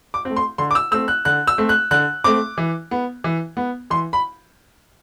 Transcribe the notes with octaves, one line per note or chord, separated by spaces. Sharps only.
D6
A3 C4
C6
D3 C6
D6
E6
A3 C4 E6
F#6
D3 F#6
E6
A3 C4
F#6
D3 F#6
A3 C4 D6
E3
B3
E3
B3
E3 C6
B5